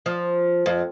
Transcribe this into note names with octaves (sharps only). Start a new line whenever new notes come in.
F3
F2